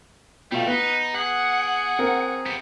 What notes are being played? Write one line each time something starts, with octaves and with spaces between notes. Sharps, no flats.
B2 G3 A3 F4
B3 D#4 B4
G#4 F#5
C4 A#4
B3 G4